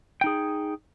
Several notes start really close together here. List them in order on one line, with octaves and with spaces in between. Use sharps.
G5 D#4 G#4